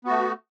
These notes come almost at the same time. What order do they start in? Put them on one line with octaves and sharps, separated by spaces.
B3 F#4 A3